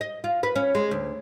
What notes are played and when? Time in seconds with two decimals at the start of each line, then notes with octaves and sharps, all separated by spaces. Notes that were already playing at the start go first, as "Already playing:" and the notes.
0.01 D#5
0.24 F4
0.43 B4
0.56 C#4
0.75 G#3
0.91 D2